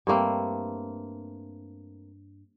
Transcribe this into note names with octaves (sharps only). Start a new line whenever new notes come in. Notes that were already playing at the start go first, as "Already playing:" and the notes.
G2 A3 A#3 C4